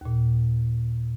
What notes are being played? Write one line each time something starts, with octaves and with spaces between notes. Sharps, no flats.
D#2 A#2